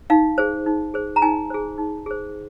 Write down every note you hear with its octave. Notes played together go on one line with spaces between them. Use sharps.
D#4 F5
G#4 C5
D#4
G#4 C5
A#5
D#4 G#5
G#4 C5
D#4
G#4 C5